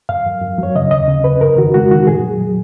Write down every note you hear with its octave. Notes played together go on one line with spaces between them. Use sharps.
F#2 F5
F#2
F#2
F#3 C#5
C#3 D#5
D#2 D#5
C#3
C#3 B4
F#2 A#4
D#3 F#4
G#3 F#4
D#3 F#4
A#2 G#4
F#3
F#3